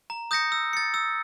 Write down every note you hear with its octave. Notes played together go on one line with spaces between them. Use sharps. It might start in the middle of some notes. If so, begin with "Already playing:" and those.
A#5
D#6 G6 A#6 C#7
E6
A6 C#7
E6